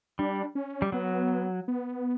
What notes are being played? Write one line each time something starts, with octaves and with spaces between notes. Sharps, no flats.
G3 D4
C#4
G3
F#3 B3
B3